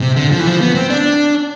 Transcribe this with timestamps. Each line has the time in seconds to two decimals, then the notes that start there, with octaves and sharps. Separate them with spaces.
0.01 C3
0.16 D3
0.32 F3
0.39 E3
0.47 F3
0.60 B3
0.75 C4
0.90 D4